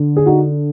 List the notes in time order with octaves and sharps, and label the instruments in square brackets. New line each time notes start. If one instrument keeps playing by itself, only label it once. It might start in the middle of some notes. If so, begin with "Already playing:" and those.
Already playing: [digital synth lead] D3
[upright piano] G#4
D#4 F#4